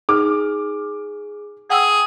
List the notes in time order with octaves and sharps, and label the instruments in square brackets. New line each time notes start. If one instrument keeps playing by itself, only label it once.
[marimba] D#4 [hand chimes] G#4 [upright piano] D6 F6
[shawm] G#4 [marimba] F#5 G5 E6